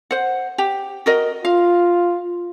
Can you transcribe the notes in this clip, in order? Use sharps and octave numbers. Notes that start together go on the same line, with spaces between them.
C5 F#5
G4
F#4 A#4 D#5
F4 F5